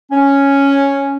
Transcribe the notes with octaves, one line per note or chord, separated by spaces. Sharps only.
C#4